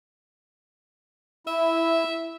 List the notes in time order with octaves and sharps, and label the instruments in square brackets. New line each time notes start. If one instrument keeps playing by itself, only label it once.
[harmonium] E4 [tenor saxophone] E5